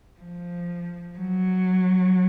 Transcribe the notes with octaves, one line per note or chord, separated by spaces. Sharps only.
F3
F#3